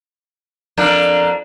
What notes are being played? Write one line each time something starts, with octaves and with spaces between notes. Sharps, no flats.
F2 A#3 D4